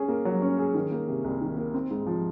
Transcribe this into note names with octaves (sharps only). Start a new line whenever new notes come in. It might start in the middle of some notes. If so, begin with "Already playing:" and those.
Already playing: C#4 G#4
A#3
F#3
C#4
G#4
D#3
A#3
C3
C2
D#3
A#3
C4
G#2
F3